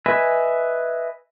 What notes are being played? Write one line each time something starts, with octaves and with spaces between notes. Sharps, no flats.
B4 D#5 E5 G#5 B5